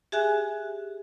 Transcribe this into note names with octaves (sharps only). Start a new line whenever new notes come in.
G4 G#4 E5 G#5 F#6